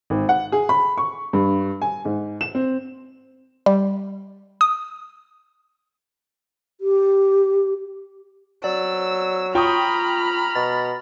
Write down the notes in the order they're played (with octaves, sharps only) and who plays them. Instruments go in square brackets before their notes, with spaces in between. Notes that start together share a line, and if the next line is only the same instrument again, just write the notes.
[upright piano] G#1
F#5
G#4
B5
C#6
G2
G#5
G#2
E7
C4
[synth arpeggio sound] G3
D#6
[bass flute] G4
[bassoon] F#3 [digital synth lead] D5 [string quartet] E6
[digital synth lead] F4 [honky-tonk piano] G5 C#6 D#6 [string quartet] A#5 B5 F6
[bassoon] B2 [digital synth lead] A6